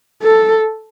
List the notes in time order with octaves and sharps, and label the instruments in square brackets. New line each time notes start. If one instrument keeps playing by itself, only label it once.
[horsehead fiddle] A4